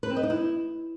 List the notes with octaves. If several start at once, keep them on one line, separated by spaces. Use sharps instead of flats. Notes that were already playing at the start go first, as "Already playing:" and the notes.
B4
C4
D#5
D#4
E4